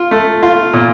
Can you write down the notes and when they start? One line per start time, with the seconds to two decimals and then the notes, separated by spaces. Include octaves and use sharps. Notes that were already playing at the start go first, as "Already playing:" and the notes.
Already playing: F4
0.11 A3
0.43 F4
0.73 A#2